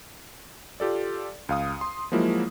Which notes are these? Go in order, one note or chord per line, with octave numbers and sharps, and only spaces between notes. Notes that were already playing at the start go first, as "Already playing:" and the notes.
F4 G4 A4 D5
C#2 F5 D#6
C6
F3 F#3 G#3 A#3 E4 F4